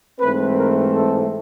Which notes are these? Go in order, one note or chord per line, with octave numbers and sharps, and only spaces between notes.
G#2 E3 A3 C4 B4
A#4
A4